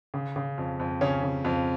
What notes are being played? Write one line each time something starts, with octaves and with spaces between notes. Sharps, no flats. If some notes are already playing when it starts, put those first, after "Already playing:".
C#3
C#3
F2
F2
C#3 C#4
C#3
F2